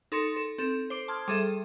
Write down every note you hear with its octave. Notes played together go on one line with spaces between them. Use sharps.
D#4 A4 C6 A6 C#7
A4
C4 A4
C5 D6 D7
A5 C6 D#6 F6 G#6
G3 G#4 A4 E5